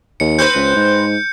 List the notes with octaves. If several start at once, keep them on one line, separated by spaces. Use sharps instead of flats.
D#2 C#7
C4 B4 C5 G6 C#7
C#2
G#2